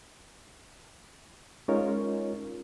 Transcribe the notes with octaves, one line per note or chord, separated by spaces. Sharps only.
G#3 C#4 D#4 F4 A#4 C#5